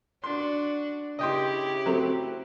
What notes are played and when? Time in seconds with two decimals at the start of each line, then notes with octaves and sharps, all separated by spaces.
0.24 D4 F#4 C6
1.19 C#3 E4 G4 D#5 G5 C6
1.86 F#3 A3 C4